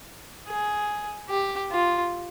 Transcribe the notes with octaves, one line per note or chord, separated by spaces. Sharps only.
G#4
G4
F4